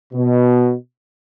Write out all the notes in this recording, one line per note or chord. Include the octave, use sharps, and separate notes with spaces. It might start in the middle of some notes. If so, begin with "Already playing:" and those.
B2